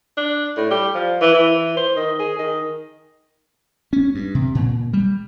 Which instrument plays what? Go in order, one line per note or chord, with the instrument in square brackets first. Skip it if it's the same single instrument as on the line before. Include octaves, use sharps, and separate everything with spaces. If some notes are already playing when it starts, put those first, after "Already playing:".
[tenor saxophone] D4
A2
G3
F3
E3
E3
C5
D#3
G#4
D#3
[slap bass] C#4
G2
C3
A#2
G3